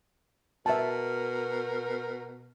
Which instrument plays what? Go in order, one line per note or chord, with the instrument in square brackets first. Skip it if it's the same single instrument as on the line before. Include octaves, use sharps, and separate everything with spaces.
[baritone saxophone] B2 [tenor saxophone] A#4 [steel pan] E5 A5